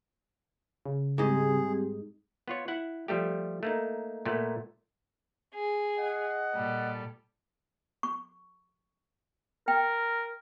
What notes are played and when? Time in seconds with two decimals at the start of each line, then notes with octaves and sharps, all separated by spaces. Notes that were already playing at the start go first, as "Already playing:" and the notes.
0.86 C#3
1.18 G#2 G3 C4 G4 G#4 D#5
2.48 B3 F4 C#5
2.68 E4 F#5
3.08 F3 G3 A3 G4
3.63 A3 A#3 D#4
4.25 A#2 A3 B3
5.54 G#4
5.97 D#5 F#5
6.55 A#2 G3 A4
8.03 C#6
9.68 A#4 G5